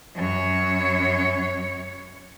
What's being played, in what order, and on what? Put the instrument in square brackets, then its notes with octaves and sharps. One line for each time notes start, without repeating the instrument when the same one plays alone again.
[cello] F#2 C#5